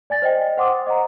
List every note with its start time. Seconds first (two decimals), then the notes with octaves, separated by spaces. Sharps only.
0.10 D5 G#5 A6 A#6
0.22 C5 D#5 G5
0.57 C5 F#5 C6 D6 D#6
0.87 D#5 F#5 A#5